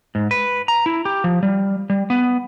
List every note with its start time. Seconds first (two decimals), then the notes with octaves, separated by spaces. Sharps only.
0.15 G#2
0.31 B4
0.68 A#5
0.86 E4
1.05 G4
1.24 F3
1.43 G3
1.90 G3
2.10 B3